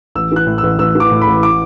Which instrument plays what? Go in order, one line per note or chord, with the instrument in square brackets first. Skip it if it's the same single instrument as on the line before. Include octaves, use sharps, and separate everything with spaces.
[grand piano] A1 E6
E3 F#6
A2
E6
A1
A1 E6
E3
D6
A2
B5
A1
D6